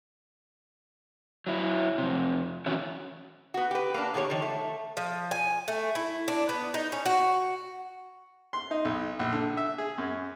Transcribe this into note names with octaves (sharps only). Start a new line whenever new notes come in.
F#3 E4
F2 C3
E3 F#3 C#4 E4 F#4
B3 F#4
G4 B4
A#3 B3 D4
B2 D#3 G4 B4 C#5
D#3 F3
A3
F3
G#5
A3
E4
D4
B3
D#4
C#4
F#4
C6
D#4
B1
A#1
D3
E5
G#4
F#2